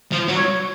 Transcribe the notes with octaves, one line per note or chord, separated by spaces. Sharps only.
F3
F#3
C#5